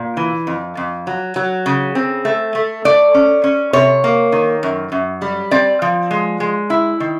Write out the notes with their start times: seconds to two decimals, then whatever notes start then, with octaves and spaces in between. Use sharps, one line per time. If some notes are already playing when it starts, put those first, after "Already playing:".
Already playing: A#2
0.17 E3
0.47 F2
0.77 F2
1.07 F#3
1.36 F#3
1.66 C#3
1.95 C4
2.25 A3
2.55 A3
2.85 A3 D5
3.14 C#4
3.44 C#4
3.73 C3 C#5
4.04 A#3
4.32 D#3
4.63 F#2
4.92 F#2
5.22 G3
5.51 C4 D5
5.82 F3
6.11 G#3
6.40 G#3
6.70 E4
7.00 D#3